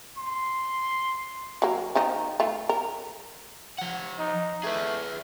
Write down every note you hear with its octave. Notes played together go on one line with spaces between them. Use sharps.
C6
F#3 A#3
D#3 F3 D#4
A3 F4
A#4
F3 F#5
D#4
A3 G#4 B4